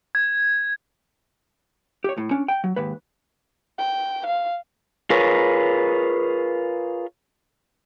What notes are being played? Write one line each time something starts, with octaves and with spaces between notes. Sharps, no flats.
G#6
G4 C#5
A2
C#4 D4
G5
F#3
D#2 G#2 B4
G5
F5
F4 G#4 A#4 B4 C#5